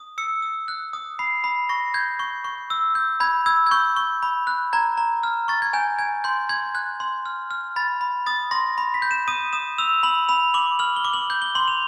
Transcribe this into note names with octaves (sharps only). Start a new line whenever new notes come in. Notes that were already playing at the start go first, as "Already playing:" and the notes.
Already playing: D#6
E6 C#7
E6
F#6
D#6
B5 C7
B5
C#6 A#6
G6 G#6
C#6
C#6
E6
G6
B5 G#6
E6 G#6
G#6
C#6 G6
C#6
B5
F#6
A#5 G#6
A#5
F6
C#6 A6
G#6
G#5 G6
G#5 G#6
C6 G6
C6 G#6
F#6 G#6
C6
F6
F6
B5 A6
B5
D#6 A6
C6 A#6
B5
B6
G6
E7
D#6 D#7
D#6 E7
E6 F7
B5 F#7
B5 F7
D6 F#7
F6 F#7
G7
D6
F#7
G6
G7
C6 F#7
F7